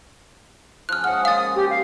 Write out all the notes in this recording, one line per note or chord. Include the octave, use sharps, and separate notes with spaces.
C#3 F3 F6 F#6
G#2 C#4 D#5 F#5 F6
A#2 G#3 F5 D#6 A6
G4
F5